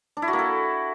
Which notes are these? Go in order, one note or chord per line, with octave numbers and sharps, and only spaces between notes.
D4
E4
F#4
A#3
A4